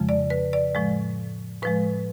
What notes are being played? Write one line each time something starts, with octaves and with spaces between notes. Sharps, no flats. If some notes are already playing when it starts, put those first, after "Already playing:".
Already playing: F2 C#3 F3 G#3
D5
B4
D5
A2 F3 G#3
A2 F3 G#3 B4